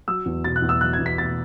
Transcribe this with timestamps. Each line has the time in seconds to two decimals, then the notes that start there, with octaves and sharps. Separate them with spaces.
0.08 F#3 E6
0.26 E2
0.44 B2 A6
0.56 F#6
0.62 E2
0.69 E6
0.81 F#3 F#6
0.93 G#6
0.99 E2
1.06 B6
1.18 B2 A6